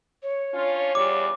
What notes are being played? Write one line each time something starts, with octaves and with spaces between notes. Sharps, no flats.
C#5
C#4 D4 F4
E2 G3 D5 D6